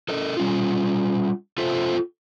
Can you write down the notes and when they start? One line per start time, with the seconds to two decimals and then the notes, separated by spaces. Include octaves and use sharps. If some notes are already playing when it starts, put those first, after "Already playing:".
0.09 A4 A#4 D#5
0.37 G3 C#4 F4
1.58 F4 A4 C5 E5